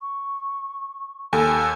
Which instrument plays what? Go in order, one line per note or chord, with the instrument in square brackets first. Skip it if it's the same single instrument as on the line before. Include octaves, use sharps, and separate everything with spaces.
[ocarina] C#6
[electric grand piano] D#2 [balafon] A4 [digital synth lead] G#5 [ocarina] E6